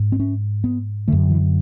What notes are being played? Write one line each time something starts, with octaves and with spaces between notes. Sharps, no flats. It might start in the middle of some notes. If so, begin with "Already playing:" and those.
Already playing: G#2
C4
C#4
B3
F#2 D3 A3
E3